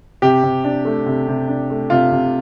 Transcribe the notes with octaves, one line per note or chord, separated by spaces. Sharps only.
C3 G4
C3
D4
A3
C3
C3
D4
A3
C3 F4
C3